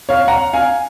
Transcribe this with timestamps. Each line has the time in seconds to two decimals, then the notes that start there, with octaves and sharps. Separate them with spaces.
0.09 C#5 F5
0.28 F#5 A#5
0.53 F5 G#5